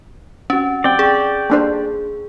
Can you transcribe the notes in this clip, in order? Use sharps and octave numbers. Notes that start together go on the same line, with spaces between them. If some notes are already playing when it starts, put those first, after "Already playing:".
C4 C#4 F#4
C4 D5 G5
G#4
A#3 D4 C5